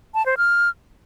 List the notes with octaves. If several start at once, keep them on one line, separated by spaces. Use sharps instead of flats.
A5
C5
F6